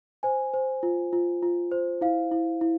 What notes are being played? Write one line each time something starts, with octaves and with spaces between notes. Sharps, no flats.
C5 G#5
C5
F4
F4
F4
C5
E4 F5
E4
E4